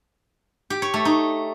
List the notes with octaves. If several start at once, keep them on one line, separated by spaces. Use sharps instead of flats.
G4
C#5
A3
D#4